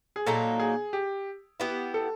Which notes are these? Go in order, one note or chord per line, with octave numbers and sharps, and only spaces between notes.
G#4
A#2 F#3 A#3 D#4 A4
G#4
G4
B3 E4 G4
A4